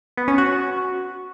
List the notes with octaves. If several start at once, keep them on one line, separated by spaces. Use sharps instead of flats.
B3
C#4
F#4